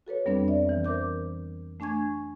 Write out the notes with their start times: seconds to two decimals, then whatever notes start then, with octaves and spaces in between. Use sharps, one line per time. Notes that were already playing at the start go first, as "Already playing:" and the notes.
0.07 F#4 A4 B4 C#5
0.25 F2 G3 B3 C4 D4 B4
0.48 D5 E5
0.69 E3
0.85 A#4 C5 D6 G6
1.80 A3 D4 G#5 C#6 G#6